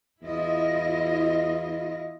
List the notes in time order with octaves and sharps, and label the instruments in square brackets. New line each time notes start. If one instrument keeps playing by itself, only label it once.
[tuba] E2 [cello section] E4 F4 D#5